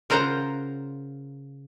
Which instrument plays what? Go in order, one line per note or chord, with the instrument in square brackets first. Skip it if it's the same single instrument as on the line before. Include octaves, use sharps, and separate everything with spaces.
[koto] C#3 F4 A#4 C5 F#5 A#5